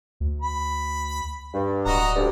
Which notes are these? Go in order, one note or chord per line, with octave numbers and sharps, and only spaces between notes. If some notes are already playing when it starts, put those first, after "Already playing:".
D2
B5
G2
D1 F#4 D#5 A#5
D2 G2 D5